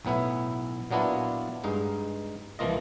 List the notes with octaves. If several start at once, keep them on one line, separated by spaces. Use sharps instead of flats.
B1 A2 B3 E4 E5
A#2 F#3 B3 D4 E4 F4
G2 G#3 D#4
C2 E3 F3 A#3 F4 D#5